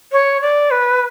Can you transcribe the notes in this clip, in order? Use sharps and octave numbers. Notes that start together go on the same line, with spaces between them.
C#5
D5
B4